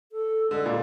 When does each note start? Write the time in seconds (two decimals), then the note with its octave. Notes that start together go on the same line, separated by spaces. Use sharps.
0.12 A4
0.51 D3 G#3
0.66 A#2